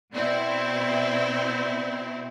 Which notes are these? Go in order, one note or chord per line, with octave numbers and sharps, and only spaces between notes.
B2 C4 E4 D5